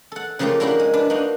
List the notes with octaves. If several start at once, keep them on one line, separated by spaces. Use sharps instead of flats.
A4 F#5
C#3 F3 A3 A#3 F4 G4
A#3 D4 E4 F#4 G4
G#3
D4 B4
A#3 D4 D#4 F#4